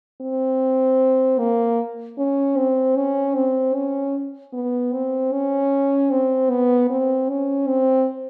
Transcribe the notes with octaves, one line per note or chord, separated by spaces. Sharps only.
C4
A#3
C#4
C4
C#4
C4
C#4
B3
C4
C#4
C4
B3
C4
C#4
C4